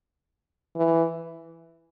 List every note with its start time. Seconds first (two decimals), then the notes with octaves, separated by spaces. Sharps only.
0.76 E3